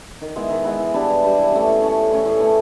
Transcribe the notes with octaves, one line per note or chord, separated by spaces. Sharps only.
D#3
G#3 B3 E4
D#3
G#3 B3 E4
E3
G3 B3 D4
E3
G3 B3 D4
E3
A3 C#4
E3
A3 C#4
A2
E3 A3 C#4
A2
E3 A3 C#4